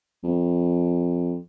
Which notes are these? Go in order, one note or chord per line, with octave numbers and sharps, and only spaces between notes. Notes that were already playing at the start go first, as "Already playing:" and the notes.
F2